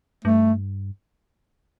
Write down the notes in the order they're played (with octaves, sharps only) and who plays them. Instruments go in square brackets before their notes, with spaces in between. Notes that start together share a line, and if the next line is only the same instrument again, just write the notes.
[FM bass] G2 [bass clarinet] A3